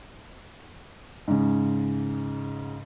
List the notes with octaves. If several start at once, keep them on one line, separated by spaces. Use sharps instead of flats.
G#2 C#3